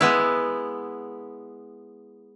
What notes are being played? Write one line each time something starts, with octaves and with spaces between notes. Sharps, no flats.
G#3 B3 E4